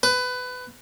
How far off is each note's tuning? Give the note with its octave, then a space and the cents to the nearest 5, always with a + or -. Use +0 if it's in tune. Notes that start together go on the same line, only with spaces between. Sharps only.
B4 +20